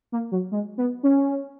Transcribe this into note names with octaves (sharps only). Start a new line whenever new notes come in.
A#3
F#3
G#3
B3
C#4